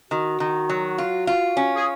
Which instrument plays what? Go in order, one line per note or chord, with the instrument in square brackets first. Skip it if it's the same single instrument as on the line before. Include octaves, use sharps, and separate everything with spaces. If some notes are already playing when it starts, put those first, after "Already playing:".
[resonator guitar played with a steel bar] D#3 [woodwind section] F#4
[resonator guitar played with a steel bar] D#3
F#3
F4
F4
C#4
[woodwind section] G#4